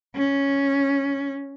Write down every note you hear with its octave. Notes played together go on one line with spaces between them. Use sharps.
C#4